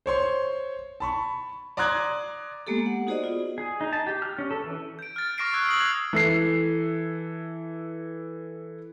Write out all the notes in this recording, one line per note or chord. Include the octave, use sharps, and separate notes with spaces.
C5 C#5 C6
A5 B5 C#6
D5 A#5 C6 D#6 F#6 G#6
G#3 A#3 B3 G4 A4
F#5
D#4 F#4 G#4 C5 D5 D#5
B3 F4
G#4
D#4
A5
G4
F6
C#4
A4
E3
G6 D7
F6 A6
C#6 D6 F6 A#6 C7 D7
C#6 E6 F#6 G#6
D#6 C7 F#7
F#6 G#6 F7
E3 A4 C7